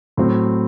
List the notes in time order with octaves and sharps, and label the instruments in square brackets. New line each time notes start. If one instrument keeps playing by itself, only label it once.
[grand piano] A2 F#3 C4